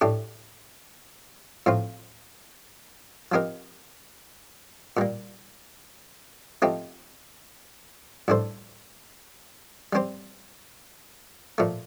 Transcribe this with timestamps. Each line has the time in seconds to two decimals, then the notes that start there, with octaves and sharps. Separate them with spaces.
0.01 A2 A3 D4 G4
1.66 A2 F3 C4 F4
3.32 F3 C4 D#4 G4 A#4
4.97 A#2 G3 A#3
6.62 F3 A3 C4 D#4 G4
8.28 A2 G3 D4 A4 C5
9.93 G3 C4 G4 C5
11.58 A#2 F3 A3